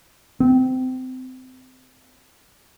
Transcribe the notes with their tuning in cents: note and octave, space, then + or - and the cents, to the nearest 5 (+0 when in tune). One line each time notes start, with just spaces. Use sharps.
C4 -25